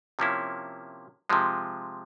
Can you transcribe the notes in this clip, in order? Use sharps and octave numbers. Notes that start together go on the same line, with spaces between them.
C3 F3 A#3 C#4 E4
C3 F3 G#3